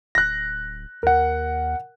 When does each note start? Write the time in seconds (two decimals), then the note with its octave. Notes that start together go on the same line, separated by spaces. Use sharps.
0.15 D1 F#6 A#6
1.03 D#2 A#4 F#5